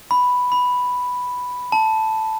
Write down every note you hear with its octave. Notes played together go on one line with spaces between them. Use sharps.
B5
B5
A5